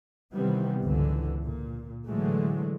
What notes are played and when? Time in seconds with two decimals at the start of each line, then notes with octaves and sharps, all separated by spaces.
0.34 C3 D#3 E3 G3 B3 C4
0.83 G1 C#2 G#2 D3 E3
1.44 A#2
2.07 A2 D3 E3 F#3 G#3 A3